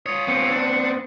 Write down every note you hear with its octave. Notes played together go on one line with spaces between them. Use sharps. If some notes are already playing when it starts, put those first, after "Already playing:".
F4 C#5 D#6
B3 C4 C#7
D4